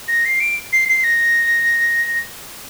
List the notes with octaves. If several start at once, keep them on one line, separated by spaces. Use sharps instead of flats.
A#6
C7
D7
C7
C7
A#6